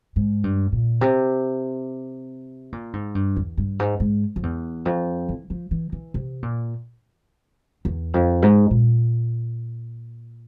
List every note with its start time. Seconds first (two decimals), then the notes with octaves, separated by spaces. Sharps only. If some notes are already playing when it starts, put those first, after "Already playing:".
0.16 G#2
0.44 G2
0.72 A#2
1.01 C3
2.72 A#2
2.93 G#2
3.15 G2
3.36 E2
3.57 G2
3.79 G#2
4.00 G#2
4.36 F2
4.43 E2
4.85 F2
5.29 E3
5.50 F3
5.71 E3
5.92 E3
6.14 C3
6.43 A#2
7.85 E2
8.14 F2
8.42 G#2
8.71 A#2